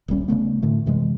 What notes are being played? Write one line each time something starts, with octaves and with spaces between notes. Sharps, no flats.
D#1 A#1 G3 C#4
C#3 F#3 A3 B3
A2 D3 A3
F#2 C3 E3 G#3